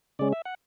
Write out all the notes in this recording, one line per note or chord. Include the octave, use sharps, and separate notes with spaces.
C#3 G#3 C#4 D5
E5
F#5